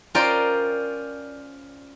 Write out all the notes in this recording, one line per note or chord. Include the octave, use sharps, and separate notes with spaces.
C#4 F4 A#4 C5 D5 G5